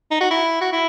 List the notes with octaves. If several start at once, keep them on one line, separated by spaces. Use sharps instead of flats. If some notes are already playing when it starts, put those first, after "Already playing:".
D#4
F#4
E4
F#4
E4